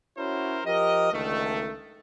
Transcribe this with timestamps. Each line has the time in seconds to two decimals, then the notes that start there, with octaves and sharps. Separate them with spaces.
0.18 C#4 E4 F#4 A#4 C5 C#5
0.66 F3 G4 A#4 D#5
1.12 C#2 D3 D#3 A3